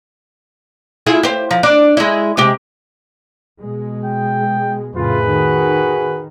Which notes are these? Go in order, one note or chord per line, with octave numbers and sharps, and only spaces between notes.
E4 F4 G#4
G4 C5
F3
D4
G#3 E4
C3 G#3 G4
B2 G#3
G5
F2 A2 C#3 F4 G#4 B4
D#3 F#4